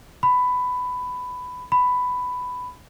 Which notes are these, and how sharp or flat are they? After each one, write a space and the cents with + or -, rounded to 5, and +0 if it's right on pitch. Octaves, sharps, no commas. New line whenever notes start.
B5 +15
B5 +10